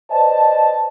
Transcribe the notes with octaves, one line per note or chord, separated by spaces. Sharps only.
B4 C5 D5 D#5 A5